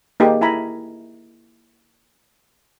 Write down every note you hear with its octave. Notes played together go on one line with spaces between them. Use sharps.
A#3 D#4 G4 G#4
E4 G#5 A#5 B5